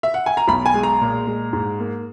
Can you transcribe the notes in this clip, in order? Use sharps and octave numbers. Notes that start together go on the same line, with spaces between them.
E5
F#5
G#5
A#5
B1 B5
G#5
G#3
A#5
A#2
G#3
G#2
A#3